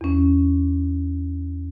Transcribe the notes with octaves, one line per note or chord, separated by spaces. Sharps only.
E2 C#4